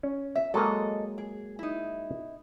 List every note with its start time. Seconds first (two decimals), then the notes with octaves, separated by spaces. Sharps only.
0.03 C#4
0.36 E5
0.54 F#3 G#3 A#3 A4 D#5
1.18 G#4
1.59 D#4 E4